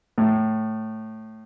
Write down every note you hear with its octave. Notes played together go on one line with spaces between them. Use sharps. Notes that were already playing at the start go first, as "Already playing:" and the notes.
A2